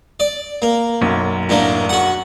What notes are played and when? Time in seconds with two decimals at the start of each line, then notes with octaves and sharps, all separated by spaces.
0.20 D5
0.62 A#3
1.01 B1 F#2
1.49 A2 D3 A#3
1.89 F#4 F#5